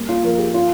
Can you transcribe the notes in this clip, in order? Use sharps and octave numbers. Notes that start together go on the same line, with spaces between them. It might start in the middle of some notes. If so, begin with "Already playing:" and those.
Already playing: G3 A#3
F4
F3 F4 A#4
G4
F4